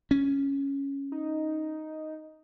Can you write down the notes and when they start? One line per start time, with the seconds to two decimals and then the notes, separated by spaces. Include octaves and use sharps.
0.11 C#4
1.12 D#4